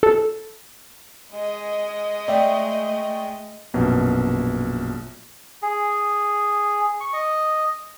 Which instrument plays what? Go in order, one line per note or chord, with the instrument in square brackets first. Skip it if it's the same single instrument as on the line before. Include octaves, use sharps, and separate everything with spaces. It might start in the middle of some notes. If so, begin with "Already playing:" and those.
[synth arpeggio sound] A4
[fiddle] G#3 D#5
[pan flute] A3 [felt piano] D5 E5 G5
[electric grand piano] A#1 F#2 B2
[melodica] G#4
C#6
D#5